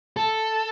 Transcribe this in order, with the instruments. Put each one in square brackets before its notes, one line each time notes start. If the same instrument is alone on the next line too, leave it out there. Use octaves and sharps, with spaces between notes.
[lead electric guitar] A4